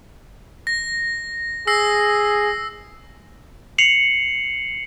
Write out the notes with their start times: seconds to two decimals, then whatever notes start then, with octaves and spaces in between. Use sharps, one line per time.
0.67 A#6
1.67 G#4 E6 A#6 C7
3.78 C7 C#7 F7 F#7